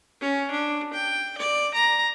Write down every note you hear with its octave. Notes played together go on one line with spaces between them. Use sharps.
C#4
D4
G5
D5
A#5